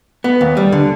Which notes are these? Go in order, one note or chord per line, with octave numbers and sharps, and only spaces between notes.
B3
D#2
G3
D3